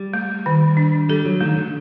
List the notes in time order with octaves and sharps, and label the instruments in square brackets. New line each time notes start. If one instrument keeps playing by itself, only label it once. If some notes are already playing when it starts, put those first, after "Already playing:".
Already playing: [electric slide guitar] G3
[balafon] A3
D#3
D4
[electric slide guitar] G3 [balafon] A4
[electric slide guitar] F#3
[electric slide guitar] D#3 [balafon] A3
[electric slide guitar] D3